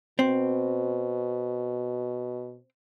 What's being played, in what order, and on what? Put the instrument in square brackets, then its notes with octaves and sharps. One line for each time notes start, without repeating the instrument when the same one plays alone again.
[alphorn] B2 [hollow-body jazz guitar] C4